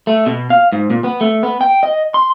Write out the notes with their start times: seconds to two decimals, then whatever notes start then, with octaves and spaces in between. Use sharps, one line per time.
0.07 A3
0.26 B2
0.50 F5
0.72 G#2
0.90 A#2
1.04 B3
1.21 A3
1.43 B3
1.61 G5
1.83 D#5
2.14 C6